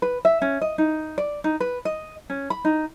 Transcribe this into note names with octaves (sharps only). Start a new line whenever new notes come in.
B4
E5
C#4
D#5
D#4
D5
D#4
B4
D#5
C#4
B5
D#4